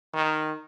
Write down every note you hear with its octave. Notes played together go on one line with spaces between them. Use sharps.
D#3